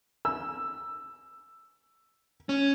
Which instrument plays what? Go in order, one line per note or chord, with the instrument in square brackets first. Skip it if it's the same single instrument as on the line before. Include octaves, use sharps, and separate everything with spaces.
[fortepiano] E6
[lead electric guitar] C#4